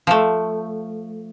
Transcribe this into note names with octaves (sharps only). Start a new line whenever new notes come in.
F3 A3